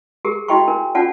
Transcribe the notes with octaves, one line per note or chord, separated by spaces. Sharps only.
G4 G#4 A#4
E4 F#4 D#5 G5 B5 C#6
D4 A#4
C#4 D4 F4 D5 F#5 A5